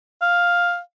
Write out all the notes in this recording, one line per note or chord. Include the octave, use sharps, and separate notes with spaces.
F5